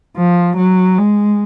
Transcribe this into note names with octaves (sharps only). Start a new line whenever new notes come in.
F3
F#3
G#3